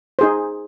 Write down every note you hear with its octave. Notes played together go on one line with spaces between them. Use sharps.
D#4 G#4 C5